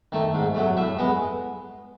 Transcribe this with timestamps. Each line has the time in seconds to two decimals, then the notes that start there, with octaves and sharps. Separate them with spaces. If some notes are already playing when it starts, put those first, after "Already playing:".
0.12 D#3 A3
0.34 G#2
0.55 F#3 A3
0.77 A2 E5
0.99 G#3 B3